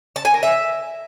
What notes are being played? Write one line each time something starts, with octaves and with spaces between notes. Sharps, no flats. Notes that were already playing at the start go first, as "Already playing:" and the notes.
A5
G#5
A#4
E5